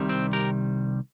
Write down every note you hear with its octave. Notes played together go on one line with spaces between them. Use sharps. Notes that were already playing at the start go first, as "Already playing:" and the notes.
Already playing: C2 C3 D#3 G3
C4
G4 A#4